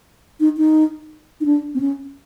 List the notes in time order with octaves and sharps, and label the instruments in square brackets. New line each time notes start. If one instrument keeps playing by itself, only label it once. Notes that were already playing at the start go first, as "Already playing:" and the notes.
[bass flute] D#4
D#4
D#4
D4
C4
C#4